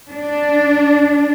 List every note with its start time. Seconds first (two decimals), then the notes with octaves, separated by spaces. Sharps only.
0.12 D4